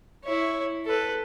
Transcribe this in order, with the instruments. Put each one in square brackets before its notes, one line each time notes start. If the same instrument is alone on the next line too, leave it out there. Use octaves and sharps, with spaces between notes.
[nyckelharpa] E4 C#5
A4 B4